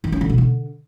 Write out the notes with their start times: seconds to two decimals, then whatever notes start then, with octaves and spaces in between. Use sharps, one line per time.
0.04 D#3
0.12 C#4
0.21 D3
0.29 B2
0.38 D3